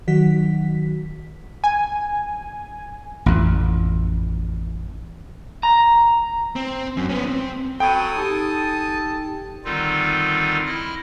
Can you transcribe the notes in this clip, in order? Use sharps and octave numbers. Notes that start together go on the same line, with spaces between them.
D#3 F#3 F#4 B6
G#5
A1 F2
A#5
C4
F#2
B3 C#4
C4
F#3 A4 G5 G#5 B5 D#6
D#4 G4 A5
D3 D#3 G3 C4 D#4 F4
E4 D#5 F6